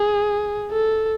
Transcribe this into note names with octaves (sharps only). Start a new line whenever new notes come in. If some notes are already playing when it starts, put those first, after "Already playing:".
Already playing: G#4
A4